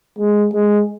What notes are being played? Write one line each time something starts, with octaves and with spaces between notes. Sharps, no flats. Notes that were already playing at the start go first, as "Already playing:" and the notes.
G#3
G#3